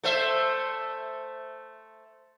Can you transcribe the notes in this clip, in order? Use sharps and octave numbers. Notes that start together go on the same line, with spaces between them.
A3 C5 E5